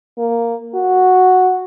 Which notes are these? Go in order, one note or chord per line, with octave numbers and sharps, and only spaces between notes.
A#3
F#4